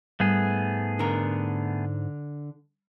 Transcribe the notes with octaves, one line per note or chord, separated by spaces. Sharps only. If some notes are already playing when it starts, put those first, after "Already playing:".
G#2 G3 A3 B3 G#4
D3 A#4